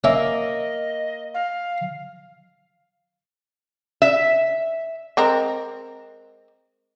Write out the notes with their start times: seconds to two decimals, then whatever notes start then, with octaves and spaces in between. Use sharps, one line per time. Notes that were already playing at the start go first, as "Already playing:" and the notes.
0.04 A#3 C#4 D#5 E5
1.34 F5
4.02 E5
5.17 G#3 C4 A#4